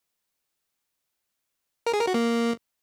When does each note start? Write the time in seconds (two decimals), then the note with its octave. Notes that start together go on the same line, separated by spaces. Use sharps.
1.86 A#4
1.93 G#4
2.00 A#4
2.07 F#4
2.14 A#3